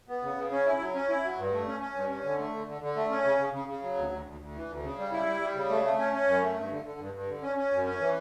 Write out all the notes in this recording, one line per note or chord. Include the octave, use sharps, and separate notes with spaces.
B3
C#3
C#3
C#4
E4
F#3
C#4
E4
F#3
G2
A3
C#4
C#4
G2
C#4
D3
A3
D3
D3
D3
A3
C#4
C#3
C#3
C#3
C#3
F#3
D2
D2
D2
D2
E3
D2
C#3
G3
E4
G3
G3
C#3
A3
A3
C#4
C#4
F#2
A3
G2
D3
D3
G2
G2
D3
C#4
C#4
F#2
C#4
E3